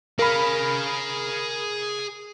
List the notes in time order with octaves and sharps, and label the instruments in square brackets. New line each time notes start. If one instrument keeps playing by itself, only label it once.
[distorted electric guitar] G#4 F5 [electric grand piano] A#4 B5